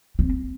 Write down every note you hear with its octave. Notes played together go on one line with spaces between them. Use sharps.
C4